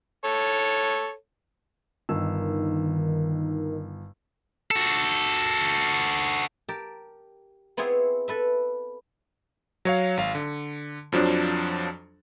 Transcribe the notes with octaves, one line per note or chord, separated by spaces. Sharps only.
A4 C#5
G1 D#3 E6
F#4 A4
G4 A#4 A5
B3 C4 E4 F4 G#4 C#5
A4 B4 E5
F#3 C#5 F5
G#1 F5
D3
F2 F3 F#3 D4